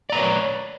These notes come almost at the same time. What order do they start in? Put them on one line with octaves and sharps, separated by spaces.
D5 A#5 B4 C#5